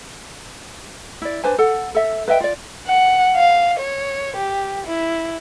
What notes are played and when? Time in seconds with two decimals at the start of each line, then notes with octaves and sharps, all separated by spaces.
1.22 E4 D5
1.44 D4 B4 C5 G#5
1.58 A4 F#5
1.95 A4 E5
2.28 B4 D#5 E5 G5
2.40 F4 D5
2.87 F#5
3.36 F5
3.79 C#5
4.36 G4
4.86 E4